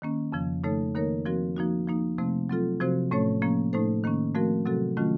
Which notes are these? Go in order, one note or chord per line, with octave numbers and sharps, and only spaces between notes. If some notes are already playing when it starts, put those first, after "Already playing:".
D#3 A#3 C#4
F2 C#3 F3
C#3 A3 D#4 A4 C#5
D#3 A#3 D#4 A#4 C#5
F3 C4 F#4 A#4
F3 A#3 D#4 F#4
F3 A#3 D#4
C3 F3 A3 C4
F#3 C4 F4 A4
C3 F3 C4 F#4 C5
A2 A3 C#4 A4 C#5
F3 A#3 C#4
A2 A3 D#4 A4 C5
D#3 A#3 C#4
F3 A3 C4 F#4 A#4
C3 F#3 C4 F#4 A4
D#3 F#3 A3 C#4 F4